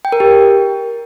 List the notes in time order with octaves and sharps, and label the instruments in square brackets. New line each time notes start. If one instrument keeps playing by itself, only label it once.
[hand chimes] G5
A#4
G4